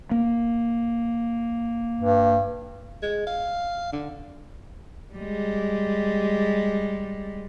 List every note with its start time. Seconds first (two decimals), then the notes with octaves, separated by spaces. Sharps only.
0.11 A#3
2.01 G2
3.02 G#3
3.27 F5
3.93 D3
5.14 G3 G#3